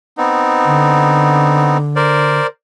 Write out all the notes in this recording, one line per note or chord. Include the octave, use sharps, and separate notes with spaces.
B3 C4 D#4
D3
A#4 C5 D5